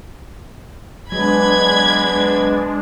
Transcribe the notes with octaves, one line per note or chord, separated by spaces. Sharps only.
F#3 G#3 B3 D4 B4 G#5 B5 G#6